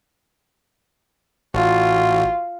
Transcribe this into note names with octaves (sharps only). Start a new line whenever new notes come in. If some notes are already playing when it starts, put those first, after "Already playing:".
A1 F4 F#4